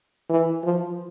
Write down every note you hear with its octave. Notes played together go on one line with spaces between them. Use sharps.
E3
F3